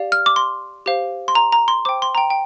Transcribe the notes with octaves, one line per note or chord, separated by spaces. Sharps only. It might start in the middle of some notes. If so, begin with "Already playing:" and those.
Already playing: G4 D5 F5
F6
D6
C6
G4 C5 F5
C6
A#5
A#5
C6
C5 G5 D6
C6
A#5
G5
G5